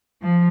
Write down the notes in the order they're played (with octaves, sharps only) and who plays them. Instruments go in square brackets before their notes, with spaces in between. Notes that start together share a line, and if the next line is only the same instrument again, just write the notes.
[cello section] F3